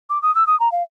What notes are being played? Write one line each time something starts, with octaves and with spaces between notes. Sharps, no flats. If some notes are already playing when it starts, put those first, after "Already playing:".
D6
D#6
E6
D#6
A#5
F5